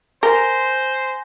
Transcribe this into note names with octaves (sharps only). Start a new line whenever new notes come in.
A#4 C5 G#5 A#6 G7